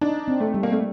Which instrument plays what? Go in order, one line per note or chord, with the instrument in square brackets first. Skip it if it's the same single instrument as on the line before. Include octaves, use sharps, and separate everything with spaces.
[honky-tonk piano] D4 [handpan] D#4
[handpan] C4
[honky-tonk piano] A3
[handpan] G3
[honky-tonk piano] A#3
A3